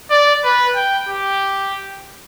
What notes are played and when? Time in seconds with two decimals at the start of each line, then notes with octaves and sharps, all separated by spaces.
0.11 D5
0.44 B4
0.76 G5
1.09 G4